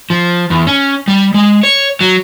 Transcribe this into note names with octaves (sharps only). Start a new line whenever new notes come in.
F3
E2
C#4
G3
G#3
C#5
F#3